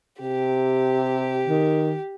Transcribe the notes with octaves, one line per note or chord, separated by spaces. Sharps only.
C3 G4
D#3